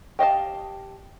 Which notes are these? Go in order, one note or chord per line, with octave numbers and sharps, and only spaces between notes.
G4 D#5 F5 A5